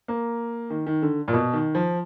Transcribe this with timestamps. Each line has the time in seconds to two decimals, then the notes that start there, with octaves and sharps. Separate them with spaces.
0.08 A#3
0.70 D#3
0.86 D#3
1.02 D3
1.28 A#2
1.33 B2
1.53 D#3
1.75 F3